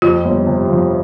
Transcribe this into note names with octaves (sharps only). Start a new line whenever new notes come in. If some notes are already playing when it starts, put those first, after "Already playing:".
F2 F4
G1
C3
F3